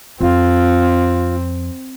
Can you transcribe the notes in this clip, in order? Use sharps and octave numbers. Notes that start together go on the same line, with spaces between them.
F2 C4 F4